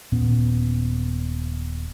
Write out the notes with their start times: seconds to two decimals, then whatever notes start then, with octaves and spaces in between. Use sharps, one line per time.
0.12 D#1 A#2 B3 C#4